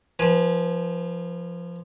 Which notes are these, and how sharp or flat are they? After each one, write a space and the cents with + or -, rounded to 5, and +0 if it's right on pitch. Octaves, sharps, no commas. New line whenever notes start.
F3 -10 B4 -35 G#5 +0